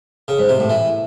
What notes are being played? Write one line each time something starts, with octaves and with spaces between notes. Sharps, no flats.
C#3
G#2
C3
A2
E3